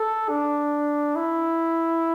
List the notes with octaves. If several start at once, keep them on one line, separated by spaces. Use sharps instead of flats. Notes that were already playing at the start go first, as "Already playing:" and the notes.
Already playing: A4
D4
E4